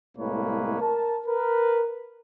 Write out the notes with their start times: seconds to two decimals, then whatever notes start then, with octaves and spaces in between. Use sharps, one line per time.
0.17 C2 A2 G#3 A#3 B4 C#5
0.80 A#4 A5
1.26 A#4 B4